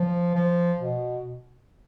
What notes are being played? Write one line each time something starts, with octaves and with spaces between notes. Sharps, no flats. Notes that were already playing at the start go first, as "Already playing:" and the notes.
Already playing: F3
F3
B2